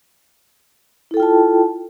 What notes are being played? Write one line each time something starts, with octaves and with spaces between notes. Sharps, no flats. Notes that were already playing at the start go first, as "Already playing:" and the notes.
E4 F4 A4 G5 A5